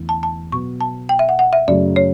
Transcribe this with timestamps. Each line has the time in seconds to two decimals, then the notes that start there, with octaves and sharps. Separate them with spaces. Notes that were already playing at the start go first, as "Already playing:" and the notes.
Already playing: E2 D3 A3 E4
0.09 A5
0.23 A5
0.52 B2 F#3 B3 C#6
0.81 A5
1.09 G5
1.19 E5
1.29 F#5
1.39 F#5
1.53 E5
1.68 F#2 C#3 F#3 A3 D5
1.96 C#5